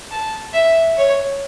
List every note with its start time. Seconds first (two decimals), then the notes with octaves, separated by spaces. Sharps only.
0.11 A5
0.54 E5
0.97 C#5